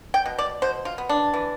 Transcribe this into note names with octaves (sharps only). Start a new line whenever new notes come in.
G5
B2
D5
B2 C5
F4
B3
D4
E3